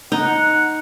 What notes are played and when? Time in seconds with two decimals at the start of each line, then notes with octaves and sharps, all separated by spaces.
0.12 D#4 F#5